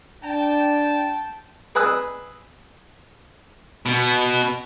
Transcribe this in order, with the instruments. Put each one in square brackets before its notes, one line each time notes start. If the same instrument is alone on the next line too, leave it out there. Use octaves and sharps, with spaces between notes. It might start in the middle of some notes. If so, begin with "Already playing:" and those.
[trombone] D4 [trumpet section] G5 A5
[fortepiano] G#4 B4 D#6 E6 F#6
[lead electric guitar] B2 B3